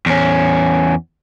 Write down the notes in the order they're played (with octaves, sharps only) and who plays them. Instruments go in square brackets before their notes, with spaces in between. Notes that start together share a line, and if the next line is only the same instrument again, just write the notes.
[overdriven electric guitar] E2 C#4